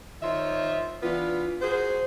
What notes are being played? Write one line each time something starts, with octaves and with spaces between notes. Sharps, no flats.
D#3 F4 C5 C#5 D#5 E5
E3 B3 D4 F4
F#4 G#4 A#4 C5